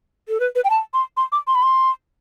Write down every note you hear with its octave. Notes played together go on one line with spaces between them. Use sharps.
A4
B4
B4
G5
A5
C6
C6
D6
C6
B5
C6